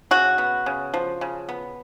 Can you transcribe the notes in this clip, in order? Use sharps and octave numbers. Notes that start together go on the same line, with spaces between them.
C#3 F#4
B3
C#3
F3
C#3
B3